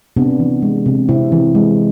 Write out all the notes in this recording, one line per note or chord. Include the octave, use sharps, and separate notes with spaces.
C3 B3 D4
E3
G#3
C3
C3 C4 E4
E3
G#3